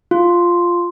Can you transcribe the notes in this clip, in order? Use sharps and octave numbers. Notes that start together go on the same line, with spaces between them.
F4